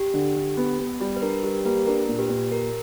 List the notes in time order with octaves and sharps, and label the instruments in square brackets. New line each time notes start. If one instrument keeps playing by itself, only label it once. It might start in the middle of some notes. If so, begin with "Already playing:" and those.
Already playing: [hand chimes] G4
[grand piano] D3
D3
B3
B3
G3
[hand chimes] B4
[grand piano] D4 [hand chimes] A#4
[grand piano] G3 [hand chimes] G4 B4
[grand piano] A#3 [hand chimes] G4 B4
[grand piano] D4 [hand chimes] A#4
[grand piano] A#2
[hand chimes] G4 B4
[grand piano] A#2
[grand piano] G4 [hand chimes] A#4